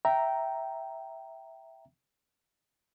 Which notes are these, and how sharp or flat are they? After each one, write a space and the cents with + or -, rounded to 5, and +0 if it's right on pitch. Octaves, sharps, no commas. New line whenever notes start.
E5 +0 G5 -10 A#5 +0